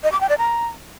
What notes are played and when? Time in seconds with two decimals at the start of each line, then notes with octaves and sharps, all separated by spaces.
0.03 D#5
0.12 D6
0.21 G5
0.29 D5
0.38 A#5